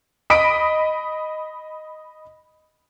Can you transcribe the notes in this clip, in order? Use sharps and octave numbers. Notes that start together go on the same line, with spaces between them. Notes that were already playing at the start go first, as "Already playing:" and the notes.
D#5 B5 D#6 B6 D7